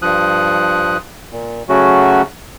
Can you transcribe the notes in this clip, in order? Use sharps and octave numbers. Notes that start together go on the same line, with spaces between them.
G2 F3 D#6 F#6
A#2
C#3 F#3 A3 C#4 F#4